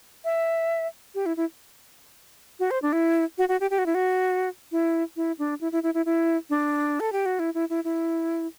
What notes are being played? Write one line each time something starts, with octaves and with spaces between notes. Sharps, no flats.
E5
G4
E4
E4
F#4
C5
D4
E4
F#4
F#4
G4
G4
F#4
E4
F#4
E4
E4
D4
E4
E4
E4
E4
E4
D4
A4
G4
F#4
E4
E4
E4
E4